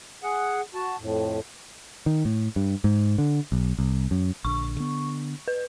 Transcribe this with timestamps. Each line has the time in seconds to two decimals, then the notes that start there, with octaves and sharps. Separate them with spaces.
0.23 G#4 F#5
0.74 F#4 A5
1.00 F2 A2
2.06 D#3
2.25 A2
2.56 G2
2.84 G#2
3.18 D3
3.52 B1
3.79 C2
4.11 F#2
4.45 A#1 D3 C#6
4.76 D3 B3
5.48 B4